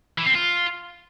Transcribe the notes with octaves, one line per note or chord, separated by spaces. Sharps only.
E3
C4
F4